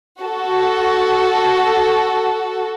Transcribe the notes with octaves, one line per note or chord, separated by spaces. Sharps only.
F#4 A4